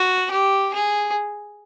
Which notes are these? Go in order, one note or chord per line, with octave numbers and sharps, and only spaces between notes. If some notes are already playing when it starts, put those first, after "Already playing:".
Already playing: F#4
G4
G#4